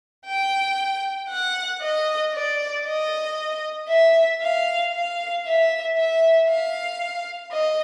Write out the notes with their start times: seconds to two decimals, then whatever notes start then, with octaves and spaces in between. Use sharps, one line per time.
0.26 G5
1.30 F#5
1.82 D#5
2.34 D5
2.85 D#5
3.89 E5
4.42 F5
4.93 F5
5.46 E5
5.97 E5
6.49 F5
7.52 D#5